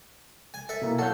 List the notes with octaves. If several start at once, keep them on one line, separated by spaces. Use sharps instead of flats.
G#5
A4 E5
B2 A#3 E4
F#3 A4 F5 G6